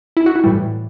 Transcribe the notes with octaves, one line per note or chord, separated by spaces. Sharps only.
E4
F#4
E4
A2 E3 G3